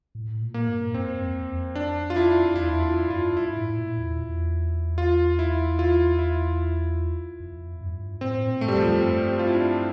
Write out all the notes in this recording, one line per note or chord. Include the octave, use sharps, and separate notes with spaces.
A2
A#2
A#3
G2
F2 C4
F2
E2
F2
D4
F4
E4
E2 E4
F2 F4
G2 F4
G2 E4
A2
A#2
E2
E2
F4
E4
F4
E4
F2
G2
A2 C4
A#2
A3
G2 G3
F2 F3
G3
G2 C4
C4
F4
E4
D4